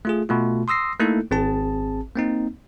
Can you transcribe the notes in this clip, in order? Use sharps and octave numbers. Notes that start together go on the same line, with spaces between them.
A3 F4 G#4
B2 A3 F4
C6 D#6 E6 A#6 C7
A3 A#3 D#4 E4 A4
G#1 C4 G#4 A5
A#3 C4 D#4